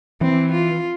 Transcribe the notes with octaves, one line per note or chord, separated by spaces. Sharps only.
E3 C4
F4